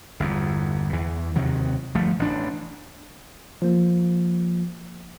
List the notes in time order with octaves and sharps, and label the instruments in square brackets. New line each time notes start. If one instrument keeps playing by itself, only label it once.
[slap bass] G1 E2
E2 E3
D#2 C3 D#3 F#3
G1 F3 A3
A1 D4
[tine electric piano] F3 A#3